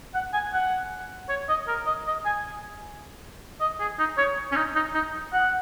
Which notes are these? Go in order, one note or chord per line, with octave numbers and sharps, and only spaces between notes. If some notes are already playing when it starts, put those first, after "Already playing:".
F#5
G#5
F#5
C#5
D#5
A#4
D#5
D#5
G#5
D#5
G#4
D#4
C#5
C#4
D#4
D#4
D#4
F#5